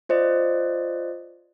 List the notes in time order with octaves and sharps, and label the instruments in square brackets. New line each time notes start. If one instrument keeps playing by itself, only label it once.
[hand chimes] F4 C5 D5 D#5